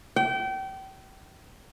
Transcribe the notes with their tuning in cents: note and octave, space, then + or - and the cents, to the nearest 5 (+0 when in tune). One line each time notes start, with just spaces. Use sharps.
G5 -30